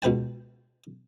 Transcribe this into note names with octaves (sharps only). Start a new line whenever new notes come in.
C#2 B2 B4 G5 A5